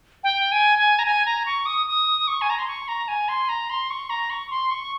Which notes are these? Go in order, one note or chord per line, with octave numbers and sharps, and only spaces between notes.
G5
G#5
G#5
A#5
G#5
A#5
C#6
D#6
D#6
C#6
G#5
A#5
C6
C#6
A#5
G#5
C6
A#5
C6
C#6
A#5
C#6
C6
C#6